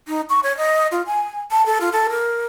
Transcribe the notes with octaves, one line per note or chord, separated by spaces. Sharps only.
D#4
C#6
C#5
D#5
F4
G#5
A5
A4
F4
A4
A#4